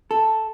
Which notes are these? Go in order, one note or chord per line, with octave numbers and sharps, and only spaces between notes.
A4